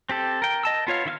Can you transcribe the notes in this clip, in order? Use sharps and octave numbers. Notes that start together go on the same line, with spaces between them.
C4 G4 A4
A#4 G5
D#5 A5 E6
B3 F4 C#5 F5
D#3 E4 E5 F5 F6